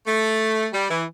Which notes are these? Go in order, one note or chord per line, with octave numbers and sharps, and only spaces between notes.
A3
G3
E3